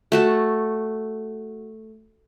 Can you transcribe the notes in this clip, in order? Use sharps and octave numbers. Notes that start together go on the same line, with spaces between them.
A3 F#4 A5